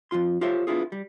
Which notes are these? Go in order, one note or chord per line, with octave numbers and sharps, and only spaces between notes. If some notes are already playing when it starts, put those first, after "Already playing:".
F2 A#2 F4 C6
F4 G4 A4 C5 C#5 E5
B3 D4 E4 F4 G#4
G3